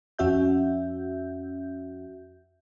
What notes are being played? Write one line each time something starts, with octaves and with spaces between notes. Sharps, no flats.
F2 C#4 F#4 E5 G6